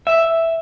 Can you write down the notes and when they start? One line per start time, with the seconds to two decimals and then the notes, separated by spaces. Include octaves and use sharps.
0.07 E5